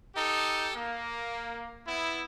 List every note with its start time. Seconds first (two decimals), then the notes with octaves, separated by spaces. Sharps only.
0.15 D#4 G4 A4
0.75 A#3
1.86 B3 E4